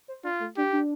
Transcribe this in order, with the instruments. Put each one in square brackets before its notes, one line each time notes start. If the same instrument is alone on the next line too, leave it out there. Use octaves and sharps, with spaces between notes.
[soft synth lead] C5
[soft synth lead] D4 [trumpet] F4
[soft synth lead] A3
[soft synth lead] D4 [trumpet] G4
[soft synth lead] D4